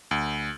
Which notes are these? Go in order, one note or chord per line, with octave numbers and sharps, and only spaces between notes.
D2